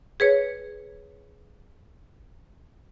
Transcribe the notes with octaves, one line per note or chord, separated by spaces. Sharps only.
G#4 B4 C#5